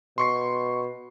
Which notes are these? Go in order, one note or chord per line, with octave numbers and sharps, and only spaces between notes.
B2 C6 C#6 C7